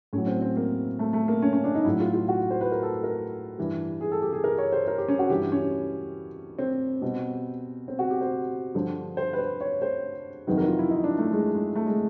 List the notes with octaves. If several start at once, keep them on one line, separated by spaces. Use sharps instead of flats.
A2 F#3 C#4
C4
C4
A#3
A3
A3
A#3
C#4
C#4
D4
D#4
A2 F#3 E4
F4
F4
F#4
C5
B4
A#4
A4
A#4
G2 E3 G3
G#4
A4
G4
G#4
A#4
C#5
C5
A#4
G4
C#4
F#4
G2 E3 G3 G4
C#4
C4
B2 G3
C4
F#4
G4
C5
G2 D3 F3
C5
B4
C5
C#5
C5
F2 C3 D#3 F#3 B4
A#4
F4
E4
D#4
D4
A3
G#3
G#3
A3
G#3